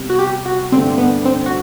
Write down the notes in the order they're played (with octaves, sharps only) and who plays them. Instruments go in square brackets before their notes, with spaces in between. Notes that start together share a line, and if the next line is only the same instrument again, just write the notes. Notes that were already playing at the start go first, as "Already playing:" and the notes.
Already playing: [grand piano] C3 G3 B3
[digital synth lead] F#4
G4
F#4
[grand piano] G2 D3 A3 D4 G4 [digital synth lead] C4
[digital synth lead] B3
C4
F#4